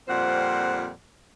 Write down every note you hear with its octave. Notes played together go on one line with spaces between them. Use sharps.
F2 A#2 G3 C4 C5 F#5